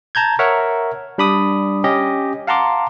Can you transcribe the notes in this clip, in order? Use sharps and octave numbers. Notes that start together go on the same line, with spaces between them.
A5 A#5 G6 G#6
A#4 C#5 E5 F#5
G3 D4 B5 D6 D#6
C#4 G4 D#5
F5 F#5 A5 A#5 C6 D6